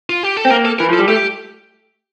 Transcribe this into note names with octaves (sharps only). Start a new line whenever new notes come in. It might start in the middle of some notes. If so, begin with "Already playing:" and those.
F4
G4
A4
C4
A#3 A#4
A4
E3 A#4
F3 A4
G3
A3 G4